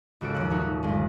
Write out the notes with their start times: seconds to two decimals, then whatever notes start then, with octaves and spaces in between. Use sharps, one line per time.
0.21 G#1 C#2 F#4 A4 D7
0.34 D#2 F3 F#3 F#5
0.50 D#1 D#4 F#4
0.83 G1 G#3